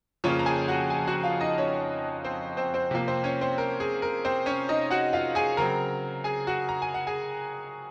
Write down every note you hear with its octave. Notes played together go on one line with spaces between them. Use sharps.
F2 C#3 F3 A#3 C#4 C#5
A#5
G#4 G#5
F#4 F#5
G#4 G#5
F#4 F#5
F4 F5
D#4 D#5
C#4 C#5
C4 C5
C4 C5
C4 C5
C3 F3 A#3
C4 C5
C#4 C#5
C4 C5
A#4
G#4
A#4
C4 C5
C#4 C#5
D#4 D#5
F#4 F#5
F4 F5
G#4 G#5
C#3 F#3 C4 A#4 A#5
G#4 G#5
F#4 F#5
A#5
G#5
F#5
G#4 G#5